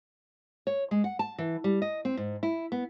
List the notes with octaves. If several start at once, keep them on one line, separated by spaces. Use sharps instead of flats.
C#5
G#3
F#5
A5
E3
G3
D#5
C4
G#2
E4
B3